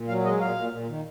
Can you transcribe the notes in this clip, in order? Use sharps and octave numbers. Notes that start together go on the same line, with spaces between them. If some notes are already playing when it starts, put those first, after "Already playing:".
Already playing: A#2
F#3 F5
G#3 D#5
A#2 F5
A#2
A#2
D#3